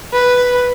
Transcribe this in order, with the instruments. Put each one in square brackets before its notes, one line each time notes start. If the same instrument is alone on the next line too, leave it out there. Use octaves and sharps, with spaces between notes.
[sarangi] B4